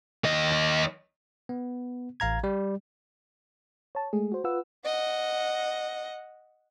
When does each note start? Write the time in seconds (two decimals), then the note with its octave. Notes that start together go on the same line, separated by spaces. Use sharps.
0.24 D#2 D#5
1.49 B3
2.20 A1 F5 A#5 G#6
2.44 G3
3.95 C#5 A5
4.13 G#3 A3 G#4
4.32 F#4 C5
4.44 F4 B4 F#5 E6
4.85 D#5 F#5